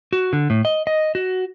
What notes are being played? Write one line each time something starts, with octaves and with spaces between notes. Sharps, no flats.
F#4
D3
A2
D#5
D#5
F#4